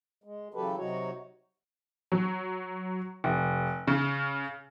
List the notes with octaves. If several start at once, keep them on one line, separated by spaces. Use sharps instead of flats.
G#3
C#3 E3 F#3 G4 A4 B4
C3 F#3 D#4 F#4 C#5
F#3
F1
C#3